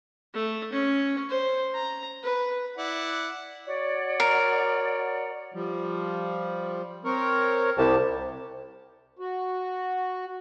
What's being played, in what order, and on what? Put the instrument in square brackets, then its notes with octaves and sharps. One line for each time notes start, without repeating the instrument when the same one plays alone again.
[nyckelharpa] A3
C#4
C5
A#5
B4
[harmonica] E4 D5 F#5
[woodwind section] F#4 C#5 D5
[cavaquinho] A#4
[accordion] F3 G3
C4 A#4 C#5
[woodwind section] C2 [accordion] G4 A5
[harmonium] F#4